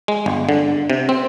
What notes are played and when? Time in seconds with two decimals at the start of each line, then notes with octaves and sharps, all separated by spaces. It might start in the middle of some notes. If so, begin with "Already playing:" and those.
0.08 G#3
0.26 G1
0.49 D3
0.90 C3
1.09 C4